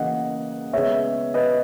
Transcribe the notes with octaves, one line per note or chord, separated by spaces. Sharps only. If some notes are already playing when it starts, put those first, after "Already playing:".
Already playing: C#3 E3 A#3 C#4 D#5 F#5
C#3 G#3 B3 C#5 E5
B4 D#5